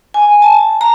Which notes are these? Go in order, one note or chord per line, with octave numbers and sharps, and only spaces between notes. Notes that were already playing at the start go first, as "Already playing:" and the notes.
G#5
A5
A#5